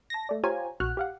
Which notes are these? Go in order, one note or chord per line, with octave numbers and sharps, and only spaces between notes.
A5 A#6
A3 D5
F4 G4 C5 C#5 G#5 A#5
A#1 F#4 F6 F#6
G4 F5 F#5